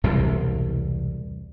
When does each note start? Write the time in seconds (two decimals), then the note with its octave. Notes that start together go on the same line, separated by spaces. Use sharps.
0.04 E1 C2 A2 C3